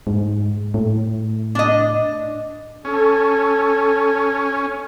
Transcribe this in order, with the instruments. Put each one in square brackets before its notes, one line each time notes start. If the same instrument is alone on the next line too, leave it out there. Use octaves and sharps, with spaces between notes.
[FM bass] G#2
A2
[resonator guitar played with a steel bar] D4 D#5
[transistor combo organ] C#4 [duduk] A4